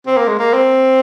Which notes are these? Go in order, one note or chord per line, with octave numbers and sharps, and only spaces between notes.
C4
A#3
G#3
A#3
C4